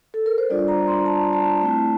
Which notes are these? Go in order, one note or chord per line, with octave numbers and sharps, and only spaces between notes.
A4
A#4
C5
G3 D4 F4 D5
A#5
C6
A5
A5
A3 C4 E4